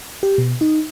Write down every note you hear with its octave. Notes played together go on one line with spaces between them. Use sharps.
G4
B2
D#4